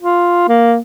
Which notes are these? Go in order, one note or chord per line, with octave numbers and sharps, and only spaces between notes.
F4
A#3